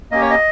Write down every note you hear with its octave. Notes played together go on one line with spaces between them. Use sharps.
A#3 C#4 G4 D#5
C#5
D#5